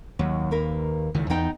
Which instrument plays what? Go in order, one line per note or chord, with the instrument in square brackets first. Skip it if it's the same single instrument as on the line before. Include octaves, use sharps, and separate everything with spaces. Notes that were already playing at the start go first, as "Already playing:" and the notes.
[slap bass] D#2 [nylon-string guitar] F#3
[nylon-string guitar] A#3 A#4 B4
[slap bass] C#2 D#3 E3
[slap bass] E2 [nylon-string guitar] B3 D#4 G5